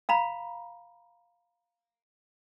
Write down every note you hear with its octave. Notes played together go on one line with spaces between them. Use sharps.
F5 A#5 B5